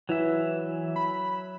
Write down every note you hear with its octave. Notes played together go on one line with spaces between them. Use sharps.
E3 F#3 E5
B5